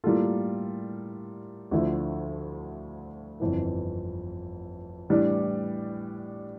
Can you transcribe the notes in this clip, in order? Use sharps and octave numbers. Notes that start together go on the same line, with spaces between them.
A2 G3 A#3 F4 A4
D2 D3 F3 A3 E4
G1 F2 E3
A2 E3 G3 D4